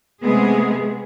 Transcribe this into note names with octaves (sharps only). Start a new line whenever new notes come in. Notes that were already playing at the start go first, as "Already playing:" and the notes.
C3 G#3 A3 B3 G#4